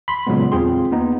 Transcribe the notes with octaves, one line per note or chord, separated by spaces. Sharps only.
B5 C6
A#2 C#3 F#3 G#3 B3
E2 C4 F4 G#4 G5 C6
A#3 B3 D#4